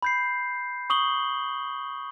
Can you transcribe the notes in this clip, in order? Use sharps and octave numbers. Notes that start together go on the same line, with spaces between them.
B5 G6 C7
C#6 D#6 F#7 G7